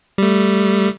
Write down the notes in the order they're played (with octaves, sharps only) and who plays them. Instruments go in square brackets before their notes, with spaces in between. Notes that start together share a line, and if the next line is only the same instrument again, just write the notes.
[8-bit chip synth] G3 A3